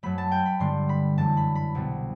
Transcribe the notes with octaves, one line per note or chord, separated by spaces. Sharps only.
F#2 F#3 A3 B5
A5
G5
B5
G2 D3 G3 B3 C6
B5
F#2 E3 A3 A5
B5
B5
C2 B2 G3 B3